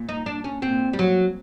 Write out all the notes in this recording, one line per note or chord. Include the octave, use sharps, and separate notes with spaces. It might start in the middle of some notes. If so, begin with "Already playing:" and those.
Already playing: A#2
D#4
D4
C#4
A#2 C4
G3
F#3